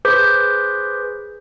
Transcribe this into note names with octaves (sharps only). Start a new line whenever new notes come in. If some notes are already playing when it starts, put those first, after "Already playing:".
G#4 B4 C5 D6 G6 B6